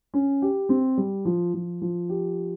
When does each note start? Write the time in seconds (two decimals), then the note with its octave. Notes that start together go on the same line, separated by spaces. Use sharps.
0.14 C#4
0.42 G4
0.69 C4
0.97 G3
1.25 F3
1.54 F3
1.82 F3
2.09 G4